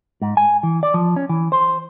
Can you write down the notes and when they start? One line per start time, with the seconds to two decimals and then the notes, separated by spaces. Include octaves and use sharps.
0.22 G#2
0.37 G#5
0.63 E3
0.83 D5
0.94 F3
1.16 C#4
1.29 E3
1.52 C5